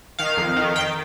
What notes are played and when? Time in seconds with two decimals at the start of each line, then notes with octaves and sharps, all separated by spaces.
0.19 D#3 F5
0.37 F2
0.56 D#3
0.76 D#3 G5